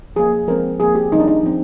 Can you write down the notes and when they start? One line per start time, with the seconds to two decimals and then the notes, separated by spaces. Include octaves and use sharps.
0.16 F3 A#3 G#4
0.47 F3 G#3 C4 A#4
0.80 F3 A#3 G#4
0.95 G4
1.12 D#3 G3 C4 D#4
1.20 D4
1.28 D#4
1.43 F3 C4